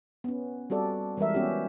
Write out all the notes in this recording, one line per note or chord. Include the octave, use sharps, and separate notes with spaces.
B3 C#4
G3 C4 F#4 A4 D5
E3 G3 G#3 A#4 E5
B3 C#4 F#4 G4